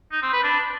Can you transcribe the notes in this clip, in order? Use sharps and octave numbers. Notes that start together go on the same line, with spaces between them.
D#4
C4
B4
D4